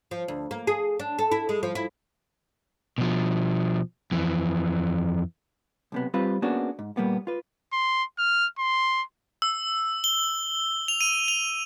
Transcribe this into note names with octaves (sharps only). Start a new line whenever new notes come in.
F3
D2
A#3
G#4
D4
A4
E4
G#3
F3
E4
B2 F3
F2 E3
B1 C3 B3
G3 C4 F4 B4
A#3 B3 C#4 D4 F#4 G#4
G#2
A#2 G3 A#3 B3
F4 B4
C6
F6
C6
E6
G7
F7
D#7
F7